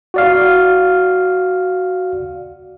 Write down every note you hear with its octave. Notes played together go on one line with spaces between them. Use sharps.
F#4 D5 F5